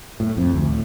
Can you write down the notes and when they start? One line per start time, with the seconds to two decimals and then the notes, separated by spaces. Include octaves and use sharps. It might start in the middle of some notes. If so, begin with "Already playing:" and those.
0.20 A2
0.37 F2
0.54 D2
0.68 A2